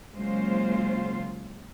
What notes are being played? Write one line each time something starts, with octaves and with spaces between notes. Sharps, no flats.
C#3 F#3 G#3 A#3 F4 C5